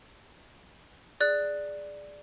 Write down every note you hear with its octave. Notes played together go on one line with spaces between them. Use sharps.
G#4 D5 F#6